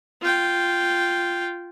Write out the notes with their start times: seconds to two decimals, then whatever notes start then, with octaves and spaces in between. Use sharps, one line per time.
0.22 F4 G5